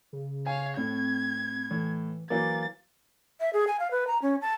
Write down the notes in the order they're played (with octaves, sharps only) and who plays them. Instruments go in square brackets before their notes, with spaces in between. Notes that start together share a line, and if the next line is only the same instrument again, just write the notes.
[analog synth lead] C#3
[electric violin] C#5 F5 [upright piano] G#5
[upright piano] A2 [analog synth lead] C4 [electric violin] G#6
[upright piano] A2 [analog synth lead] E3
[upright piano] E3 F#3 A#3 [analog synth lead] D6 [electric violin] A6
[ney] E5
G#4
G#5
F5
B4
A#5
C#4
A5